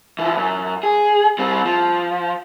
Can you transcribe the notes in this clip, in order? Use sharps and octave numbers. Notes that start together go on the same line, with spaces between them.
E3 F3
F#2
G#4
G3 C4
F3